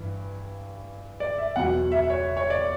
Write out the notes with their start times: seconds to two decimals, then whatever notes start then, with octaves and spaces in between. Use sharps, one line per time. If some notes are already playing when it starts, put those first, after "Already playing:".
Already playing: G2 E3
1.20 D5
1.38 E5
1.56 E2 B2 F#3 F#5
1.92 E5
2.10 C#5
2.37 C#5
2.50 D5